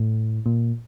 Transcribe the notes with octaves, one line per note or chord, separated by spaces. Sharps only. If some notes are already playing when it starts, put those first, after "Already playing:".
Already playing: A2
A#2